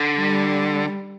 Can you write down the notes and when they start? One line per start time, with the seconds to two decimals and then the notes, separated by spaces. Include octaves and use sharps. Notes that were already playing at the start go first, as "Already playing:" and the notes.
Already playing: D3
0.18 G3